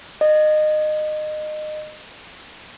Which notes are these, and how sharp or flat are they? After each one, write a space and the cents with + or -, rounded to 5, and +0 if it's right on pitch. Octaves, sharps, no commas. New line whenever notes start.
D#5 -25